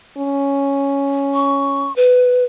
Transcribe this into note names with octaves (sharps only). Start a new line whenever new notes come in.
C#4
C#6
B4